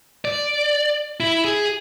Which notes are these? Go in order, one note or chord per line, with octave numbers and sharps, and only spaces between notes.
D5
E4
G#4